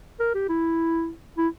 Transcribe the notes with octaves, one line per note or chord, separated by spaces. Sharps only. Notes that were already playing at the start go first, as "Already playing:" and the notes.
A#4
G4
E4
E4